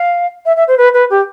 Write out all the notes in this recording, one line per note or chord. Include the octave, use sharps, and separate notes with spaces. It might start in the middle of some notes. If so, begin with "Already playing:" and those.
Already playing: F5
E5
E5
C5
B4
B4
G4